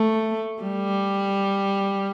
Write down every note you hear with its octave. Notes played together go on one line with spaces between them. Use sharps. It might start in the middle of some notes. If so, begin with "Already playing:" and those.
Already playing: A3
G3